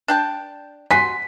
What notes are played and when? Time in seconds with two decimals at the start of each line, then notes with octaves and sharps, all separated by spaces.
0.08 D4 G5 A5
0.91 F#4 G#5 C6 B6